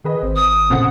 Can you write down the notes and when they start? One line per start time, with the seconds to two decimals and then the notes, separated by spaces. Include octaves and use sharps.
0.04 D#3 G#4 B4 D#5
0.23 G#1 C4
0.36 D#6
0.70 F2 A#2 C#3 C5 F#5